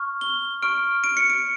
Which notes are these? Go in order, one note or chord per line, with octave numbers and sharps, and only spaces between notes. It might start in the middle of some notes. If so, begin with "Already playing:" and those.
Already playing: C#6 F6
G7
C#6 F6 D7
D7
C#7
D7